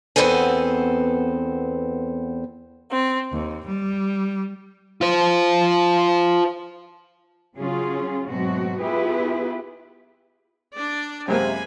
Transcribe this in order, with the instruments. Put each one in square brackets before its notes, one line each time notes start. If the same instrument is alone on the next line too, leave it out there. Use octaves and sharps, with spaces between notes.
[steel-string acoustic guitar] E2 B2 B3 C4 A4 G#5
[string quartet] C4
D#2
G3
[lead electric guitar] F4 C5
[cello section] C#3 F#3 C#4 F4 G#4
G#2 B2 F#3 A3 C4 F#4
B3 E4 F4 G4 G#4 B4
[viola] D4 D5
[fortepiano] F#2 G#3 A#3 [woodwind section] C3 [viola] G#5 B5